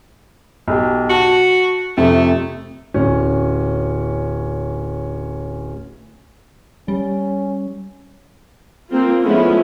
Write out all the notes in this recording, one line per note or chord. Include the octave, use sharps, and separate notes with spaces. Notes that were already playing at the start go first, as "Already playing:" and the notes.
B1 G4
F#4 A5
F2 C3 A3
D1 C#4
G3 C#4
A#3 C4 F4
F3 G#3 A3 B3 C#4 E4